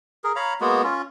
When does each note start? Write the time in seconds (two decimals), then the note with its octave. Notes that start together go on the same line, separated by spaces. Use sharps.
0.24 G#4 A#4
0.36 C#5 F5 A#5 B5
0.61 G#3 A#3 B3 F#4
0.84 C#4 F4